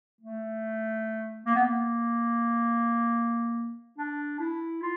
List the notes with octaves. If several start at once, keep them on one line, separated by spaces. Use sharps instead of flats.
A3
A#3
B3
A#3
D4
E4
F4